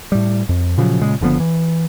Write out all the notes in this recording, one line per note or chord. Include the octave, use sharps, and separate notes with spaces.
A2 G3
F2
A#2 C#3 F3 F#3
A#2 C#3 G#3
F#1 D3 F3 B3
E3